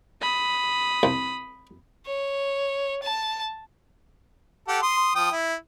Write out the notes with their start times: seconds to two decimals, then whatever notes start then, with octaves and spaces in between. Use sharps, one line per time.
0.22 B5 D#6
1.03 C2
2.07 C#5
3.02 A5
4.68 G4 A4 F#5
4.83 C6 D#6
5.15 F3 G5 D#6
5.32 E4